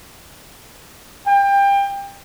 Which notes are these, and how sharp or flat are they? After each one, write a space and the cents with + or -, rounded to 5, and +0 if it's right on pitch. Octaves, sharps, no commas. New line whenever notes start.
G5 +25